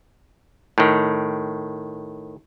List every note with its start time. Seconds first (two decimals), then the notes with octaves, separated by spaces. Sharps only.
0.78 A2 D#3